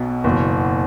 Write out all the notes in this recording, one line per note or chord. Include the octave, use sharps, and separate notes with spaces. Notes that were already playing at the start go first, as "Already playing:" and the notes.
Already playing: B1 B2
F#1 E2 B2